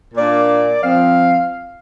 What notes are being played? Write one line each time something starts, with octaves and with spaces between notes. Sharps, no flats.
A#2 A#3 D4 D5
F3 C4 F5